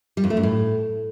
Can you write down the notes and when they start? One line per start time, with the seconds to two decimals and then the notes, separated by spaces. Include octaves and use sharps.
0.17 G3
0.24 F2
0.30 A3
0.37 F#2
0.43 A2